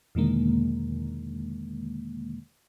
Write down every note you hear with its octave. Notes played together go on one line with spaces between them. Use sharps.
E2 B2 D3 D#3 G#3 A#3